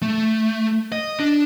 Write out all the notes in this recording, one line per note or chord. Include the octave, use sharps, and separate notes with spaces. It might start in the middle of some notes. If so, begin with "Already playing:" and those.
A3
D#5
D4